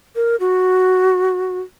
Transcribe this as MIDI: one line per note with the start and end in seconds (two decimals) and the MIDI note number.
0.16 0.36 70
0.40 1.59 66